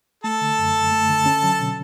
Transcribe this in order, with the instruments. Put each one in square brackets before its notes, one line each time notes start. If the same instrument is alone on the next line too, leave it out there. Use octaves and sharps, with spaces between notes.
[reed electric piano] A3 [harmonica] A4 A5
[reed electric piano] D3
F#2
F#2
A3
D3
C#4
F#3
B2